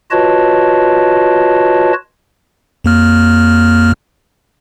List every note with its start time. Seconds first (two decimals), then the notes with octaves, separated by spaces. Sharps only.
0.11 F4 F#4 B4 C#5 D#5 A5
2.84 F2 A#3 F6